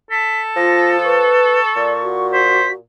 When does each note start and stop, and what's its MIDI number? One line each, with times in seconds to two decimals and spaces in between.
0.11 2.16 69
0.11 0.41 95
0.56 1.31 53
0.56 0.97 65
0.56 0.91 94
1.04 1.59 71
1.04 2.28 85
1.76 2.82 46
1.76 1.92 74
2.03 2.73 66
2.33 2.66 72
2.33 2.71 95